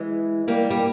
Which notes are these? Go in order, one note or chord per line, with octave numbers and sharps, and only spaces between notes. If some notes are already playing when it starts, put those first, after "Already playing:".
Already playing: E3 G#3
G3 A#3
G3